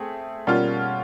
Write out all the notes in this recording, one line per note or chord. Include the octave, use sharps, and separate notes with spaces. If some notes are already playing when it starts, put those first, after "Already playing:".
Already playing: A3 C4 G#4
B2 G3 A#3 C#4 F4